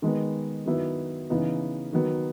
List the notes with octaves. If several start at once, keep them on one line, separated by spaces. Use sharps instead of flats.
D#3 G#3 B3
D#3 F#3 B3 E4
C#3 E3 B3 D#4
D#3 F#3 B3